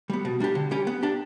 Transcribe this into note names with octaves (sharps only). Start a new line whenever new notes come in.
G3 B3
B2
G3 D4 G4
D3
G3 C#4 G4
B3
D4 G4